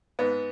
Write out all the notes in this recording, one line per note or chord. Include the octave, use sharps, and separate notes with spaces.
G#2 B3